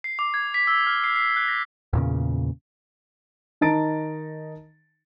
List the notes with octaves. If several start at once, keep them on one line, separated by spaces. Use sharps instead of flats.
C7
D6
G#6
B6
E6
F6
C7
C7
F#6
A#6
E2 A#2 C#3
D#3 D#4 A5 A#5 A6 D7